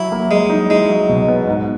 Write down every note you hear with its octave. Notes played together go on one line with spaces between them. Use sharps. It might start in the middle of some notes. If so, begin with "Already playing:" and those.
Already playing: F#3 E4
A#3
F#3 G#3
D#4
G#3 E4
F#3
B2
B3
G#2